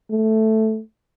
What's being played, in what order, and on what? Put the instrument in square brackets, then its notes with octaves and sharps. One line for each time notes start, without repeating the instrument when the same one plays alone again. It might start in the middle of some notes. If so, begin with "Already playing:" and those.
[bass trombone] A3